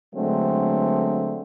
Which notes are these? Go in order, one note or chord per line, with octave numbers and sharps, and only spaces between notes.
D3 F#3 G#3 A3 B3 C4